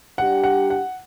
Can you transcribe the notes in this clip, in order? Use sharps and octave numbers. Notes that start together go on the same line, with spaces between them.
G3 D4 G4 F#5
F#5
F#5